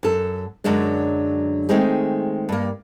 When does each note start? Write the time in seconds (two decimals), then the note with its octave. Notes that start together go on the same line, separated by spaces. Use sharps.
0.03 F#2 A4
0.64 F#2 D3 F#3 G#3 D4
1.69 D#3 G#3 A3 C4 D#4 G#4
2.49 G2 A#3